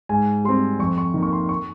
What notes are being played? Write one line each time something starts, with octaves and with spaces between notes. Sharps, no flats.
G#2 G#5
G3 C4 C6
F2 C#6
C#6
D#3 A#3
C#6
C6
C#6